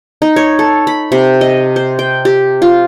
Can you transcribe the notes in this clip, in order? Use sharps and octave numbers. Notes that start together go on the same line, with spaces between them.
D#4
C#5
A4
B5
C3
D#5
C5
G5
G4
F4